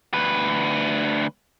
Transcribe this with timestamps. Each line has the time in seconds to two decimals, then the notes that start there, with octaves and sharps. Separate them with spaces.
0.14 D2 B4